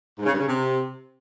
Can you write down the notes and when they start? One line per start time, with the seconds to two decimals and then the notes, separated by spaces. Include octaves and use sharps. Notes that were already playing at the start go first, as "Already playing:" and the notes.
0.18 G#2
0.25 C#3
0.33 G2
0.40 C#3
0.47 C3